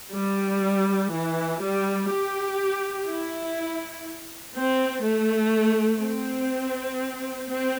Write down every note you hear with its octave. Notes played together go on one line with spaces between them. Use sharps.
G3
E3
G3
G4
E4
C4
A3
C4
C4